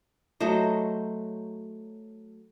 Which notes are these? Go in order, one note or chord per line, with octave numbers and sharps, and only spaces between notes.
F#3 A3 C5 D#5